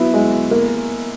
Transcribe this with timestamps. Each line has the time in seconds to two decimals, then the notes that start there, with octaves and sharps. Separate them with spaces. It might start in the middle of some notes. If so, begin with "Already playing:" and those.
Already playing: F#3 B3 E4
0.14 G#3
0.51 A#3